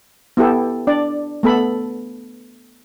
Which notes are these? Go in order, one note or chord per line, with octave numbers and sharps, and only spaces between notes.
B3 E4 G4 A4
D4 D5
A3 B3 A4 B5